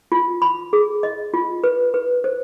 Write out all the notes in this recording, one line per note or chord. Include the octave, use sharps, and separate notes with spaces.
F4
B5
G#4
D#5
F4
B4
B4
C5